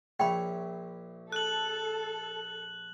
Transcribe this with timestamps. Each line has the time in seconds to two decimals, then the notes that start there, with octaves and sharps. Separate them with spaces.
0.20 A#1 C#5 E5 G5 B5
1.32 A4 F#6 F#7